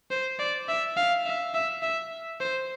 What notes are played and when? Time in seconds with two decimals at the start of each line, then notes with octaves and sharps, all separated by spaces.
0.11 C5
0.39 D5
0.68 E5
0.97 F5
1.25 E5
1.54 E5
1.83 E5
2.40 C5